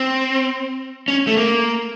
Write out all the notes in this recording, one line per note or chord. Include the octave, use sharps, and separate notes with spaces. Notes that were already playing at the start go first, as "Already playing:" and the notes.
Already playing: C4
C#4
A3
A#3